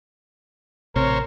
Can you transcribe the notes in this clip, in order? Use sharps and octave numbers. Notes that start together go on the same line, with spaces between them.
A1 C3 A#4 C5 C#5